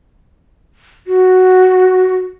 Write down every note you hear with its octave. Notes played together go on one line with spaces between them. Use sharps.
F#4